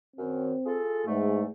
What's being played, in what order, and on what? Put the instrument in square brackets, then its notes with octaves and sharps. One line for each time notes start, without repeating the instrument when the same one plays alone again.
[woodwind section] F#2 D#3 [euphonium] C4
[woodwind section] F4 G#4 A4
[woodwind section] E2 A3 [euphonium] G#2